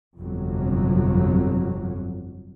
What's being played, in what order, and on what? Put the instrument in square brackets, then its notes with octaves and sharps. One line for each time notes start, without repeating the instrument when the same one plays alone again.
[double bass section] G1 F2 C3 F#3